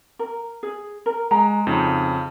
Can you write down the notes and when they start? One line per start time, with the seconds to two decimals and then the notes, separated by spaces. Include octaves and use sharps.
0.19 A#4
0.63 G#4
1.06 A#4
1.31 G#3 A#5
1.67 F2 C#3 D#4 F#4